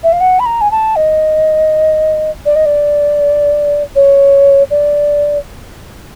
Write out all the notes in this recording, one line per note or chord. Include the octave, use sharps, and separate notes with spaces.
E5
F5
F#5
B5
A#5
G#5
A5
D#5
D5
D#5
D5
C#5
D5